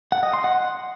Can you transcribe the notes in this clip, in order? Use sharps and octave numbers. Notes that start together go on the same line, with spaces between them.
F#5
D#5
C6
F#5